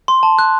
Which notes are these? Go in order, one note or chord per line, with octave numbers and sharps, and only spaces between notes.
C6
A5
F#6